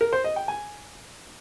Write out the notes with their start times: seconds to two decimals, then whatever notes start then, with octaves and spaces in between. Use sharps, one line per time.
0.01 A#4
0.13 C5
0.24 D#5
0.36 G5
0.48 G#5